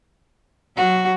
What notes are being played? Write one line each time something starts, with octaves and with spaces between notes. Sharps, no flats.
F#3 F#4